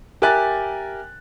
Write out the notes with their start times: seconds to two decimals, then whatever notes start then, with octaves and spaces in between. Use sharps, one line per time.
0.22 G4 A#4 E5 G#5 F#6 A6